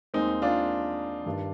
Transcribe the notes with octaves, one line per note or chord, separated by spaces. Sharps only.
D#2 D#3 G#3 C4 D#4
D4 F4
G2 D#3 G3